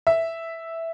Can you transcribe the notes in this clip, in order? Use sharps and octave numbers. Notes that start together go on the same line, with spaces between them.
E5